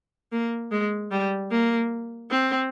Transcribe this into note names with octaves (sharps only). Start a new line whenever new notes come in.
A#3
G#3
G3
A#3
C4